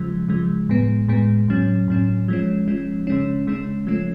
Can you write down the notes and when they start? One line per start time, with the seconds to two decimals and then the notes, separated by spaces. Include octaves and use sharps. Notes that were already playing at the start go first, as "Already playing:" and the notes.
Already playing: C#3 F3 G#3
0.29 C#3 F3 G#3
0.69 A2 G#3 B3
1.08 A2 G#3 B3
1.48 A2 F#3 C#4
1.88 A2 F#3 C#4
2.28 F3 G#3 C#4
2.68 F3 G#3 C#4
3.07 C#3 G#3 C#4
3.47 C#3 G#3 C#4
3.87 F3 A3 C#4